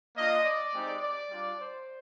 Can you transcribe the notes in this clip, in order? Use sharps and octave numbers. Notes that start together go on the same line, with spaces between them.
A#3 D4 F4 D#5
D5
G#3 C4 D#4 G4
D5
G3 D4 F4
C5